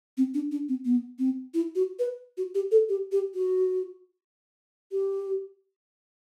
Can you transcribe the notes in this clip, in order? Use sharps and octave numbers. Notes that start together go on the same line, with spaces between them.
C4
D4
D4
C4
B3
C4
E4
F#4
B4
F#4
G4
A4
G4
G4
F#4
G4